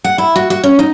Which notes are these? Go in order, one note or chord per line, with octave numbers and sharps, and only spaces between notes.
F#5
E4
F#4
F#4
C#4
D#4